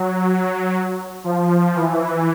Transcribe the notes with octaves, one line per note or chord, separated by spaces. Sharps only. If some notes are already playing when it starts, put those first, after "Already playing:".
Already playing: F#3
F3
E3